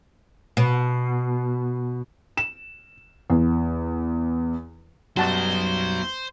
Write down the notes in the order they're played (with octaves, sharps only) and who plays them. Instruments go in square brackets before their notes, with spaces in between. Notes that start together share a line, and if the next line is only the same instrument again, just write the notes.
[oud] B2
[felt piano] E7
E2
[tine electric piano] F#2 G3 [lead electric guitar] F#3 B3 [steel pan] F#4 A5 [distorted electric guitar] C5